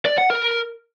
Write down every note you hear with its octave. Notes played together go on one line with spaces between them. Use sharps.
D5
F#5
A#4